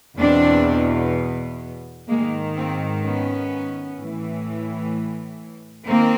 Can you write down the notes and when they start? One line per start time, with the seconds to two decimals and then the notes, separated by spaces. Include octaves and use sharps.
0.18 E2 B2 C4 D4
2.08 G#2 D#3 G#3 A#3
2.55 A#3 C4
3.02 B3 C#4
3.98 A2 E3
5.87 D#3 A#3 C4